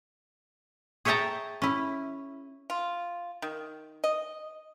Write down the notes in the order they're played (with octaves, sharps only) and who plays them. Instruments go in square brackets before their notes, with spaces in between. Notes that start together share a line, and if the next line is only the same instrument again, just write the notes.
[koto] G#4 C#5 E5 G5 A5 A#5
C#4 E4
[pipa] F4
D#3
D#5